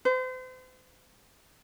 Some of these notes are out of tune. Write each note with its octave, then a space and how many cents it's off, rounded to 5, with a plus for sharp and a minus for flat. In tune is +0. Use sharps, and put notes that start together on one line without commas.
C5 -40